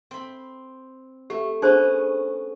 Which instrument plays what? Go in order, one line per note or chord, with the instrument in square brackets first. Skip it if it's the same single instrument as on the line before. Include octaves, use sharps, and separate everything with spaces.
[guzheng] C4 B5
[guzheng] A3 [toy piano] G4
[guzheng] B3 C#4 [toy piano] D4 G#4 C5